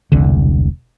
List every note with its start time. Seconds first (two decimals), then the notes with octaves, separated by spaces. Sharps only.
0.12 E1 C2 D3